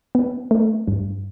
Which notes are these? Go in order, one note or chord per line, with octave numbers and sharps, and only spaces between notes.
B3
A3
G2